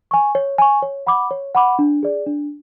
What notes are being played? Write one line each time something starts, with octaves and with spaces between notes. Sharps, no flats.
G#5 C#6
C#5
G#5 C#6
C#5
F#5 B5 D6
C#5
F#5 B5 D6
D4
G#4 D5
D4